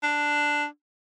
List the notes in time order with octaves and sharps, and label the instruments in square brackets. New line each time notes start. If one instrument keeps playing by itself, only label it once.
[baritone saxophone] D4